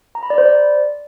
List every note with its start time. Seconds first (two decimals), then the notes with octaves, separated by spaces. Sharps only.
0.15 A#5
0.23 B5
0.30 D5
0.38 C5
0.46 D5